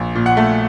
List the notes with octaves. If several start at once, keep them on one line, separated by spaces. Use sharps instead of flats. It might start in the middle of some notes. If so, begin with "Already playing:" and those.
Already playing: A#1
A#2
F#5
A3